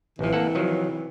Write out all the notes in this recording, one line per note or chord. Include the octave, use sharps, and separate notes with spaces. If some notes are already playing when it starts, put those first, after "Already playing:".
A1 C3 E3 F3
A#3 A4 F#5
D#3 F3 F#3